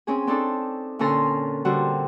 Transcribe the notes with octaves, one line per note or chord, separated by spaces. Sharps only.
C4 C#4 G#4
C4 D4 D#4 A4
A#2 D3 C#4 A4 A#5 C6
D3 G3 F#4 C5